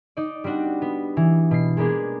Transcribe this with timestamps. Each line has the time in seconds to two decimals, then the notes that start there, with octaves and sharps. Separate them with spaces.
0.17 D#4 D5
0.44 G3 C4 D4 F#4
0.82 B3
1.17 E3
1.51 B2 C7
1.77 G#3 A#3 B3 D4 G#4